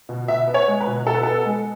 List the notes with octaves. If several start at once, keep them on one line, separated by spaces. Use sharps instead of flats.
B2
B2 E5
B3
C#5
G#3
B4
B2
B2 A4
B4
B3 A4
G#3